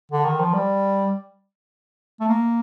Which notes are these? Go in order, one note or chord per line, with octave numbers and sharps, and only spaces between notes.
D3
D#3
F3
G3
A3
A#3